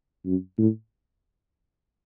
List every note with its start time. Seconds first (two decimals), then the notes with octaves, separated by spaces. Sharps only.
0.26 F#2
0.58 A2